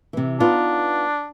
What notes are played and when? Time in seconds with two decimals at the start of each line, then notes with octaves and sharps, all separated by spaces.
0.13 C3 E3
0.40 B3 D4 D#4 F4